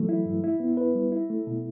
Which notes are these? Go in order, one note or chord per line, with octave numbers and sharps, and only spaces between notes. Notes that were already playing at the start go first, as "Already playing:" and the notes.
Already playing: E3 F#3 A3
E4
G2
E4
B3
B4
G3
E4
A3
B2